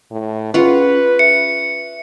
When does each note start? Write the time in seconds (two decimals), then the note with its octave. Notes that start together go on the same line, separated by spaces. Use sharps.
0.11 A2
0.54 C#4 F4 G#4 B4 F5 F#5
1.19 E5 C#7